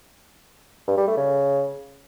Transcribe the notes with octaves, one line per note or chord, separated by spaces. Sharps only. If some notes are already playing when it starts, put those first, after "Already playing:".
G2
G3
A3
C#3